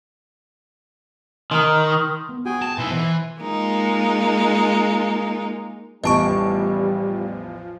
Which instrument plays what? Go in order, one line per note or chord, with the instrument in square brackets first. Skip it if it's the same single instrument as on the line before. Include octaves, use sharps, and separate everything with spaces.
[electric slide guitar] D#3 [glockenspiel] C6 D#6 F6
[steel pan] B3
[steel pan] F#4 [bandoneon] G#4 G5 G#5
[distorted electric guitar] A5
[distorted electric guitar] B2 D#4 [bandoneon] E4 B4 C6 [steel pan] E5 F#5
[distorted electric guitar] E3 [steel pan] C5
[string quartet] G#3 A#3 D#4 F4
[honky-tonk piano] A1 E2 D7 [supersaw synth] F3 [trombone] G3 [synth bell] D#5 A5 C#6